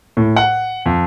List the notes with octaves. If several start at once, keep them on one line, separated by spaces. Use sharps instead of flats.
A2
F#5
F2